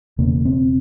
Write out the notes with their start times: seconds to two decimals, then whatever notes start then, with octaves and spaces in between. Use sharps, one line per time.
0.18 E1 E2 C#3 A#3
0.45 C4